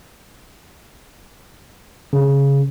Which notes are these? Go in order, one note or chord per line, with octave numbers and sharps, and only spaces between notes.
C#3